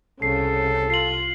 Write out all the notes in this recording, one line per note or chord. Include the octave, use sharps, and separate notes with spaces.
C2 C#3 A4 C7
F4 C7 F#7